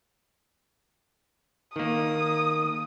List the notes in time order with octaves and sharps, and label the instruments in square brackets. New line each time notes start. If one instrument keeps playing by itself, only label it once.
[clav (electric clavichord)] D#3 A#3 [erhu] D#6